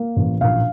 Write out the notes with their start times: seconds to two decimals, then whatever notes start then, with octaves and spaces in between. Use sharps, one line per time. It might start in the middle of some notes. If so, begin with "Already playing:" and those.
Already playing: A#3
0.16 A1
0.41 A#1 F5